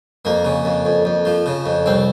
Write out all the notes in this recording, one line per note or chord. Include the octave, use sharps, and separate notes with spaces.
F2 A#3
C#3
F2
F2
F2
F3
C#3
F2
C2 C4